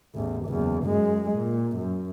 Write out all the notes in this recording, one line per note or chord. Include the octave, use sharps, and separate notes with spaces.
A1 E2
F#1 E2
F#2 G#3
A#2
F#2